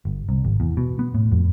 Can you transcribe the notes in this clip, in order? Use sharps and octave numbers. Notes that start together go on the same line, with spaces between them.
G1
C2
G#1
E2
B2
B3
A2
F2